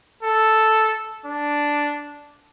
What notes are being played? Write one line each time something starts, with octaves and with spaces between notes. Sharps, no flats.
A4
D4